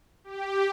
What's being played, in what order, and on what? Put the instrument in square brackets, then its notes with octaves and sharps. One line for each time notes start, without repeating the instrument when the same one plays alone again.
[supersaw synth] G4